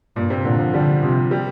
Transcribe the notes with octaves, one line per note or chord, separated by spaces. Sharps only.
G2 A#2
C3
A#2 D3
F3
D3 G3
C3 F3
G3